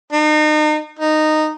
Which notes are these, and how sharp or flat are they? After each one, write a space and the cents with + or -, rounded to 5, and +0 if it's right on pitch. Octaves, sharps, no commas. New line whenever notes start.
D#4 -35
D#4 -10